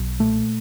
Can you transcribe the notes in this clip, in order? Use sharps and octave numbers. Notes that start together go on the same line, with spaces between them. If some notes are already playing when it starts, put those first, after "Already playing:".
Already playing: B1
A#2 A3